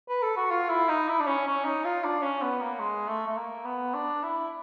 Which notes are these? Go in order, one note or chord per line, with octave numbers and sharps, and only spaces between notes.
B4
A4
F#4
F4
E4
D#4
E4
D4
C#4
C#4
D#4
F4
D4
C#4
B3
A#3
G#3
A3
A3
A#3
B3
D4
E4